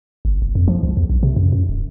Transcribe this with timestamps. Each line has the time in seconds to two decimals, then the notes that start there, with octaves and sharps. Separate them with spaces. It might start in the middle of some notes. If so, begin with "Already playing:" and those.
0.25 G1
0.42 F1
0.55 F2
0.68 F3
0.83 C#2
0.97 E2
1.10 B1
1.23 C3
1.36 F#2
1.52 F#2
1.69 D1